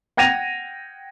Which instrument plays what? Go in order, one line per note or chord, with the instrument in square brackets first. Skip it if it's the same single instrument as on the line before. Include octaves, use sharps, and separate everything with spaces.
[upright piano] F#5 G5 G#6 A#6 D#7 F7